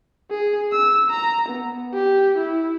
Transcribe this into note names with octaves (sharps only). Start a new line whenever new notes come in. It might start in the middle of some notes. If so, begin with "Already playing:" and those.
G#4
E6
A#5
B3
G4
E4